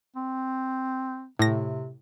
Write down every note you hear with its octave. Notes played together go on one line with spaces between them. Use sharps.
C4
A2 C3 A#6